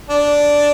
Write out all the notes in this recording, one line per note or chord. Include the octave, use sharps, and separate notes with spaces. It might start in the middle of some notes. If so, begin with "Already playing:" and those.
D4